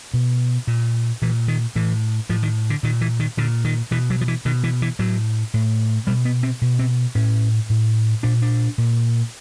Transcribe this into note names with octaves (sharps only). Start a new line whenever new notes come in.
B2
A#2
A#2 E3
D#3
A2 E3
A2 F3
D#3
D3
A#2 D#3
E3
D#3
A#2 D3
D#3
B2 E3
F#3
F3
E3
B2 D#3
E3
E3
A2 F#3
A2
B2 G3
B3
C4
B2
C4
A2 C#4
A2
A#2 D4
D4
A#2